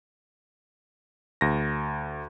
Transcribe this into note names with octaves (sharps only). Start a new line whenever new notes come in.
D2 A#6